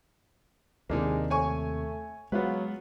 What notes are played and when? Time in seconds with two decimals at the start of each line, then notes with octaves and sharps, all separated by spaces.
0.90 D#2 C3 G#3 A#3 D4 D#4
1.30 A3 C#5 G#5 C#6
2.32 F#3 G#3 B3 F4 B4